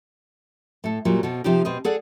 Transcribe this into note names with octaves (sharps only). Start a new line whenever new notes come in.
A2 A4
A#2 F#3 G3
B2 C4 A4
C3 F3 D#4 G4
B2 C4 D#5
G#4 A4 D5 F#5